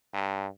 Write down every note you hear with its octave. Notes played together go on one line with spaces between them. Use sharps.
G2